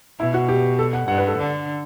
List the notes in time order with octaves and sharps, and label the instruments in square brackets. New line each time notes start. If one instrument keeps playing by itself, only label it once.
[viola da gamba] B2 [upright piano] E4
[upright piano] F#4
G4
A4
F#5
[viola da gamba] G2 [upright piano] F#5
[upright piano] B4
A4
[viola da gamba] D3